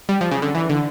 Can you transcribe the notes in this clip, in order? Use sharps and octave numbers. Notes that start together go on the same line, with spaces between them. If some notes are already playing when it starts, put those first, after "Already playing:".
G3
F3
C#3
D3
E3
D3